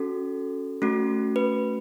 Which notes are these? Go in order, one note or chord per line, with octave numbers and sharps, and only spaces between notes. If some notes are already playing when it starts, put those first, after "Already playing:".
Already playing: C#4 F#4 A4
A3 C#4 F#4
B4